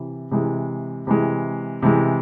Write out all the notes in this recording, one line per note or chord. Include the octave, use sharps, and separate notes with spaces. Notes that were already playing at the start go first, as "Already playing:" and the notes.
Already playing: C3 E3
C3 E3 G#3
C3 E3 G#3
C3 E3 G#3